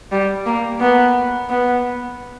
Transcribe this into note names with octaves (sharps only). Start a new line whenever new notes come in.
G3
A#3
B3
B3